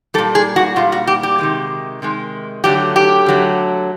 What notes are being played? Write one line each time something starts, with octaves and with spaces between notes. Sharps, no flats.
A#2 G3 A4
G#4
F#4
A#2 G3 F4
F#4
G4
G4
C3 D#3 G#3
C3 D#3 G#3
D3 F#3 A3 G4
G4
D3 F#3 A3